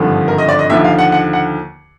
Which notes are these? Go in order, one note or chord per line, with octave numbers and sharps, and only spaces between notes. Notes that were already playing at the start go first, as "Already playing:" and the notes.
Already playing: G#1 G2 D3 F3
A#4
D#5
D5
D#5
D#2 D3 F3 E5
F5
F#5
F#5
F#5